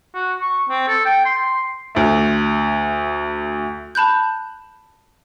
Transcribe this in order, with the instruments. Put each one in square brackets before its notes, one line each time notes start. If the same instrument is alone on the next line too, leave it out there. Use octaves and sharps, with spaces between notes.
[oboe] F#4
C#6
C4
A4
G5
C6
[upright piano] D2 A3
[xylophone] A5 B5 F#6 G6